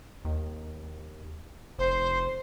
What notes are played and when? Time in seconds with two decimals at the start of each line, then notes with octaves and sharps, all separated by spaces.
0.25 D#2
1.79 F1 C5